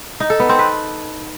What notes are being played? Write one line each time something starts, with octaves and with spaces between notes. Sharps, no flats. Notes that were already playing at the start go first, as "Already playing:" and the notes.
D#4
A4
B3
C4
B4